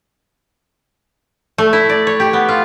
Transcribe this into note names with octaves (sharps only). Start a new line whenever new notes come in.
A3
E4
D5
C#5
G4
B3
F4